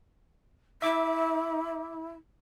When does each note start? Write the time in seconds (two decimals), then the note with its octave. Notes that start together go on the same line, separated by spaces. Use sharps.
0.82 E4 E5 D6